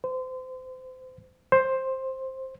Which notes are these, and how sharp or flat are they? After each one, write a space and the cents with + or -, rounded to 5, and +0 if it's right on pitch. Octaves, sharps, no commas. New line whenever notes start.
C5 -30
C5 +10